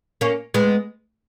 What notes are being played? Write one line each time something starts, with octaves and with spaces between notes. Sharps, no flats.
A#3 C#4
G#3 B3